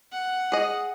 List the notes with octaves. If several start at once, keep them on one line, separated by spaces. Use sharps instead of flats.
F#5
G#4 D#5